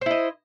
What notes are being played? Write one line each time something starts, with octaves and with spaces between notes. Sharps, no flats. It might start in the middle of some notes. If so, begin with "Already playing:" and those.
E4 C5 D#5